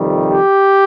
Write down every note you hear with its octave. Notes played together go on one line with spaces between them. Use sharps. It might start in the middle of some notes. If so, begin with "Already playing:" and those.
Already playing: F2 C3 D#3 G3
G4